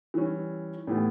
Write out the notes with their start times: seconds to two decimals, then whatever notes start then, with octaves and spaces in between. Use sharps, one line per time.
0.14 E3 G3 C#4
0.87 A2 E3 B3 E4 G4